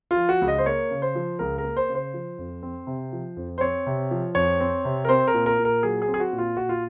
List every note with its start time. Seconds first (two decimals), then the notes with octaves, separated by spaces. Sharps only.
0.11 F4
0.16 F3
0.29 F#4
0.42 C#2
0.48 D#5
0.58 C5
0.65 A#3 C#5
0.91 C#3
1.02 C5
1.15 F3
1.39 C#2 A#4
1.58 A#4
1.64 A#3
1.77 C5
1.89 C#3
1.95 C5
2.14 F3
2.39 F2
2.63 C4
2.87 C3
3.13 F3
3.37 F2
3.58 C5
3.61 C4 C#5
3.87 C3
4.11 F3
4.35 F2 C#5
4.60 C4
4.85 C3
5.05 A#4
5.09 C4 C5
5.28 A#4
5.34 A#2
5.46 A#4
5.59 A#2
5.65 A#4
5.83 F#3 G#4
6.02 G#4
6.08 C4
6.14 G#4
6.20 F#4
6.33 A#2
6.38 F4
6.57 A#2 F#4
6.69 F4